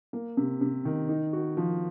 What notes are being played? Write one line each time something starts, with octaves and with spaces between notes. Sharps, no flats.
A#3
C3
C3
D#3
D#4
F#4
F3